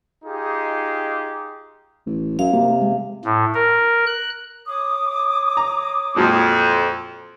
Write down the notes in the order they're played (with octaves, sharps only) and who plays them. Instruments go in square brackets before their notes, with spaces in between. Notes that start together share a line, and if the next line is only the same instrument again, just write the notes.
[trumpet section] D#4 F4 G4 G#4
[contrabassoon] A1
[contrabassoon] F#2 [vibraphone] F5
[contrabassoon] C3 [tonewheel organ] A#3
[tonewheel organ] G#3
[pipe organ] A2
A#4
F#6
[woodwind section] C#5 D6 D#6
[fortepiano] A#5
[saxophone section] F2 [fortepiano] A#2 F#3 G#3